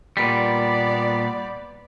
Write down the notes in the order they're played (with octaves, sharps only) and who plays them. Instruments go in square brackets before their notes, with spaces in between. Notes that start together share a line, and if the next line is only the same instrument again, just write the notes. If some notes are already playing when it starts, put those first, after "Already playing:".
[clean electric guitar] A#2 G3 [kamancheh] B3 D5